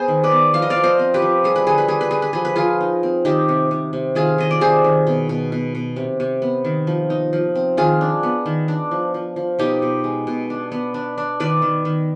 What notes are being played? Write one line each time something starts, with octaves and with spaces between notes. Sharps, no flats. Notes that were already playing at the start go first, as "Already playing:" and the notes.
Already playing: B3 G#4 C5
D#3
B4 D5
B3
F3 F5
D#5
D5 F5
F3
C5 D#5
C4
G4 B4
F3
G3 G#4
B4
D3 G#4
B4
G3 G#4
B4
G3 G#4
B4
F3 G#4
B4
F3 F4 G#4
D#4
C4
D#3 D#4 G4
C3
C3
C3
D#3 F4 G#4
D#3 D#5
D5
C3 G#4 C5
D#3
B2
B2
B2
B2
C3
C3
B3
D#3
F3
D#4
F3
C4
D#3 F4 G#4
D4
B3
D#3
D4
F3
F3
F3
B2 D#4 G4
B2
G#3
B2
D4
B3
D4
D4
D#3 B4 D5
D#3
D#3